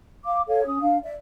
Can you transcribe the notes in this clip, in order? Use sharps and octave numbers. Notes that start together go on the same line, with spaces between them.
F5 D6
A4 C#5 F5
C#4 D#6
D4 F5
D5 E5